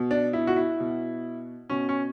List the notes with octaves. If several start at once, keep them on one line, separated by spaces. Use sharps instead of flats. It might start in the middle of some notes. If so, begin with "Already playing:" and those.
Already playing: B2
D4
E4
F#4
E4
B2
B2 C#4
C#4